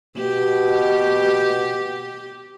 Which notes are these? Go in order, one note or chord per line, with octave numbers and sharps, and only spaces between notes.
B2 G4